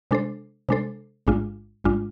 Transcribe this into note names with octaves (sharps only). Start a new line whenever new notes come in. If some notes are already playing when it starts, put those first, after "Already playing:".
C3 G#3 D4 A4 C5
C3 G#3 D4 A4 C5
A1 G#2 G#3 D4 F4
A1 G#2 G#3 D4 F4